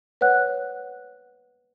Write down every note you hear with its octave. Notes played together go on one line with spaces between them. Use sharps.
B4 C#5 F#5 F#6